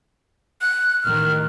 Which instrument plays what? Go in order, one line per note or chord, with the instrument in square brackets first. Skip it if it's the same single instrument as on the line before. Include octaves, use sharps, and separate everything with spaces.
[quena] F#6
[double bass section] A1 D#3 [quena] F6